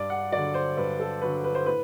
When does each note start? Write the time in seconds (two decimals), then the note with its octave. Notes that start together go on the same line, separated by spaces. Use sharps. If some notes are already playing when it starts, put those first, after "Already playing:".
Already playing: G2 D5
0.10 F#5
0.32 D3 F#3 D5
0.54 C5
0.77 G2 B4
1.00 A4
1.21 D3 F#3 B4
1.44 B4
1.55 C5
1.66 A2 B4